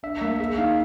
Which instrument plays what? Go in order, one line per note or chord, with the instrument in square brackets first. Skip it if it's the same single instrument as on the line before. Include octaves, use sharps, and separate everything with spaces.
[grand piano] D4 [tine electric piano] E5
[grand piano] A#3 [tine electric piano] E5
[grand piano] G#4 [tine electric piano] E5
[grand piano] D#4 [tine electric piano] F5